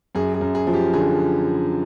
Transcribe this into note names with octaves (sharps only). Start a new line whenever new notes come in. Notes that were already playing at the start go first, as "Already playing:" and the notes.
F#2 G#4
G#4
F#2
G#4
F3
G4
D3 G#4